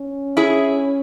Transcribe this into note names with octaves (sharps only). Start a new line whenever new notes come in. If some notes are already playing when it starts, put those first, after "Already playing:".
Already playing: C#4
E4 G#4